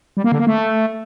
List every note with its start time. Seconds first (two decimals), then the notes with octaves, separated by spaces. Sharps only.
0.17 G3
0.24 A#3
0.32 D3
0.39 A#3
0.47 A3